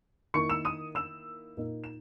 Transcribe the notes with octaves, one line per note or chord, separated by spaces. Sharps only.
D#3 A#3 E4 C#6 C#7
E6 E7
D#6 D#7
E6 E7
A#2 A#3 D#4
E7